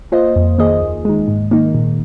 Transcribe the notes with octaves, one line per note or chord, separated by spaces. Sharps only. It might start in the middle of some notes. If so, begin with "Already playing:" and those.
A#3 F4 C5 D#5
F2
D#3 A#3 G#4 D#5
D#2
D#3 G#3
G#2
D#3 A#3 D#4
A#2